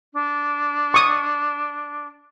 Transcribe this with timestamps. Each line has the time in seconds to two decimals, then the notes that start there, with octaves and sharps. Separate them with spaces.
0.14 D4
0.94 C#6 D#6